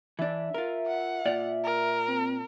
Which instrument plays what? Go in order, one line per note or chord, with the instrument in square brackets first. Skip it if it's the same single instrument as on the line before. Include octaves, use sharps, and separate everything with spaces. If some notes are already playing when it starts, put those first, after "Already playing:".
[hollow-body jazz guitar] E3 D4 [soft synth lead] E5
[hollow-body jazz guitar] F4 A#4
[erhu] F#5
[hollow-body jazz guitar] A#2 F4 D5
[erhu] A#4
[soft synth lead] C4